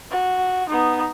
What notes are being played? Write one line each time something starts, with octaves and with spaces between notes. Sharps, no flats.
F#4
B3 D#4